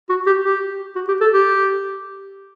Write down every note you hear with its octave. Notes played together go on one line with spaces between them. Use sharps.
F#4
G4
G4
F#4
G4
A4
G4